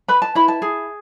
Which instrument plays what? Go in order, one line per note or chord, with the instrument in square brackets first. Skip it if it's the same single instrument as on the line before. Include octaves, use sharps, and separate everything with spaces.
[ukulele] B4 B5
A5
E4 B5
A5
G#4